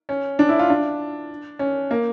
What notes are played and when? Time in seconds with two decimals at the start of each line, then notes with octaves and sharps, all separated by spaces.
0.09 C#4
0.39 D4
0.49 E4
0.59 F4
0.70 D4
1.59 C#4
1.91 A#3